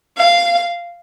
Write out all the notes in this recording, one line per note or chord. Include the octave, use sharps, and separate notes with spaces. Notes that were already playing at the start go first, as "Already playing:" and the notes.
F5